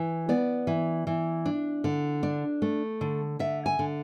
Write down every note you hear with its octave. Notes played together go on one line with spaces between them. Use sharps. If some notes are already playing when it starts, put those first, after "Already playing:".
Already playing: E3
B3 D5
E3
E3
D4
D3
D4
A3
D3
D3 E5
G#5
D3